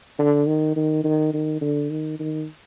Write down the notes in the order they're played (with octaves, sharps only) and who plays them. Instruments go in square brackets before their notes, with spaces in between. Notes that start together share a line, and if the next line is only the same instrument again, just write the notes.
[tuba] D3
D#3
D#3
D#3
D#3
D3
D#3
D#3